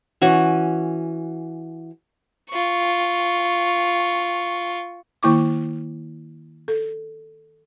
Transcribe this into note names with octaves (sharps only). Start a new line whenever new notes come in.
E3 C#4 F#4
F4 C#6
D#3 A#3 E4 C#6 D6
A4